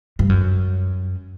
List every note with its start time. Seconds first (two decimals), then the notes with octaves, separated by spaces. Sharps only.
0.19 G2
0.29 F#2